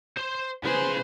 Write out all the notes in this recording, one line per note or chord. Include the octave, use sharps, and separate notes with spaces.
C5 C6
C#3 G#4 B4 C5